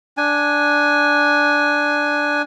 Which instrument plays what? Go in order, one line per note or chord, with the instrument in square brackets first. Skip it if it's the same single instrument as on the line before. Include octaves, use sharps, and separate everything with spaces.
[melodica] D4 G#5